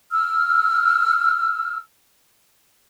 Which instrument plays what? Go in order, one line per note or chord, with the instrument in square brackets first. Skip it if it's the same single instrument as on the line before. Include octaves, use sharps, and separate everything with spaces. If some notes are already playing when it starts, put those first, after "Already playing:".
[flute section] E6 F6